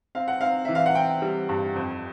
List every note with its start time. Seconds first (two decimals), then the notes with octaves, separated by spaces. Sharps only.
0.15 C4 F5
0.28 F#5
0.41 C4 F5
0.65 E3 E5
0.75 F5
0.86 F#5
0.95 C4 G5
1.22 G3
1.49 G2
1.75 F2